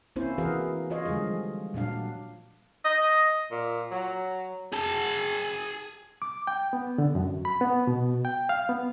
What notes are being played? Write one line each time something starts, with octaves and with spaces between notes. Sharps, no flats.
A#3 C4 C#4 E4 C5
E3 F#4 G#4 A#4 B4 F5
F4 C#5 D#5 F5
D3 F3 G3 G#3 G#4
A#2 F#3 D4 F5
D#5
A#2
F#3
G#4 A5
D6
G5
B3
D3
F#2
B5
B3
B2
G5
F5
B3